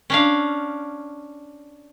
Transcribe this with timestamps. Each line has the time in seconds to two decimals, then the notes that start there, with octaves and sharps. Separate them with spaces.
0.10 C#4 D4 F5